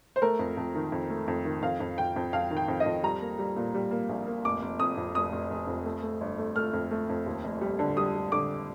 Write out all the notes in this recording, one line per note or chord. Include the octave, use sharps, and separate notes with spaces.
C5
A3 A#4
F2
F2
D#3
F2
A3
F2
D#3
F2 F5
F2
F2 G5
F2
F2 F5
D#3
G5
F2
D#5
F2
G3 A#5
A#3
G3
A#2
G3
A#3
A#1
A#3
F1 D6
F1
F2 D#6
F2
F1 D#6
F1
F1
F2
A3
A3
G1
A3
A3 F6
F2
A3
F2
D#2
F1
G3
D3
G3 D#6
G3
D3 D6